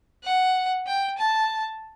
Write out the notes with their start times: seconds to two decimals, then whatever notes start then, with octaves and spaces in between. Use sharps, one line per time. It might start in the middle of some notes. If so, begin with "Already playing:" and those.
0.24 F#5
0.87 G5
1.18 A5